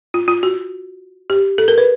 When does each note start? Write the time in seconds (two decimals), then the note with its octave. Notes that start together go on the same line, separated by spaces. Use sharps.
0.14 F4
0.28 F4
0.43 F#4
1.30 G4
1.58 A4
1.68 A#4
1.78 B4